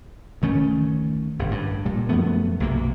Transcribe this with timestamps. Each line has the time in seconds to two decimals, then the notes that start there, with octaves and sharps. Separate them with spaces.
0.42 D2 D#3 A3 C#4
1.39 G1 A2 C3
1.51 G2
1.85 A#2 G3
2.09 F#2 F3 A3 B3
2.60 B1 C3 A#3